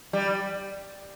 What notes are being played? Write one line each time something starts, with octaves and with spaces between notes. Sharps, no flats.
G3